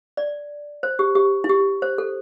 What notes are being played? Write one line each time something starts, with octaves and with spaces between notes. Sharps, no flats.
D5
C5
G4
G4
E4
G4
C5
A4